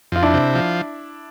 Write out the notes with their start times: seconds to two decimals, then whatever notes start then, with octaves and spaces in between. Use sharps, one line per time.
0.12 F2 F4
0.23 D4 E4
0.34 C3
0.55 F3